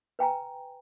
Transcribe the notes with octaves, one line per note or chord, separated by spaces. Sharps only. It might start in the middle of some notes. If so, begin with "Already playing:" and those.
B4 G5 G#5 A#5